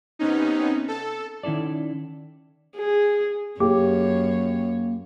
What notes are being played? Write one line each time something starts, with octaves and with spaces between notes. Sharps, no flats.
C3 B3 C#4 D#4
A4
D#3 C#4 E4 A4 D5
G#4
F#2 A#3 G4 G#4 C#5